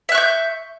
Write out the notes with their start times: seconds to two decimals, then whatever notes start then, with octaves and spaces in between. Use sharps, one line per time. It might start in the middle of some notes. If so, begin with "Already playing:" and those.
0.09 E5
0.12 F#6
0.15 C#6
0.18 G6